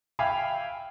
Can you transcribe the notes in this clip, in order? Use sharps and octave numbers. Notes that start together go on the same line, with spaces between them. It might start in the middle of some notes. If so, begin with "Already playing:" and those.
E5 F5 G5 G#5 B5